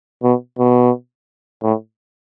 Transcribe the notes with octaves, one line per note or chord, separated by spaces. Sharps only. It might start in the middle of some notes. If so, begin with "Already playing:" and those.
B2
B2
A2